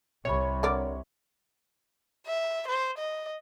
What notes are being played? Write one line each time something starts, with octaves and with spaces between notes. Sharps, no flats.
C2 C3 C#5 B5
D3 A#4 D5
E5
C5
D#5